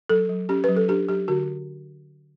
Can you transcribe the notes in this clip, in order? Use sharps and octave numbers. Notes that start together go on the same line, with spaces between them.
F#3 A4
F#3
C#4 G4
F#3 B4
A4
D4 G4
F#3 G4
D3 F#4